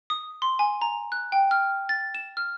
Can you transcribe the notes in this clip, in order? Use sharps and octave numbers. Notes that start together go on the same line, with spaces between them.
D#6
C6
G#5
A#5
F#6
G5
F6
A6
E7
F6